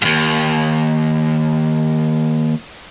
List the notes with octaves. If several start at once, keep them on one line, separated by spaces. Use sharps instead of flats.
D#2 G#2